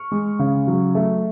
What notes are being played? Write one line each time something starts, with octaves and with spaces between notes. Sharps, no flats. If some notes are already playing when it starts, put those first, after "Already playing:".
Already playing: C#6 F6
G#3
C#3
F#3
A3